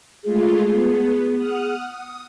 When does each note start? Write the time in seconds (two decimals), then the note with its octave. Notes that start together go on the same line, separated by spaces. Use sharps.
0.24 G#3 A3 F4 G#4
0.71 B3
1.35 F#5 D#6 F6
1.88 D#6